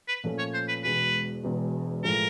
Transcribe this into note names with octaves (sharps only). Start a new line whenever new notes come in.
B4
A#2 F3 A3 C#4
C#5
C5
B4
E1 E2 B2 G#3 B4
E1 E2 B2 G#3
A2 F3 G#3 A#4